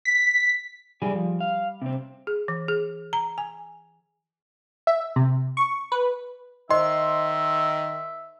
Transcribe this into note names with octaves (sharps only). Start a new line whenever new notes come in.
B6
G3 G#4 D5 G#5
F3
F5
C3 C4
G#4
E3
G#4
A#5
G#5
E5
C3
C#6
B4
D#3 C5 D#5 E5 C6